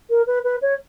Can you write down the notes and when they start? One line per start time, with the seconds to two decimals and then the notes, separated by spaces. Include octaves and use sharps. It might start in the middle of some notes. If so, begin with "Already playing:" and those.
0.09 A#4
0.26 B4
0.44 B4
0.61 C#5